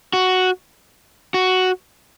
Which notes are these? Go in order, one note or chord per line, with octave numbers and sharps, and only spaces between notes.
F#4
F#4